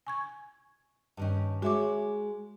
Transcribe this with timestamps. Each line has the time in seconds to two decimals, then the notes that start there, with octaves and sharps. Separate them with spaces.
0.07 G#5 C#6 G#6
1.17 G2 D#3 C#4
1.62 G#3 F#4 C#5 E5 D6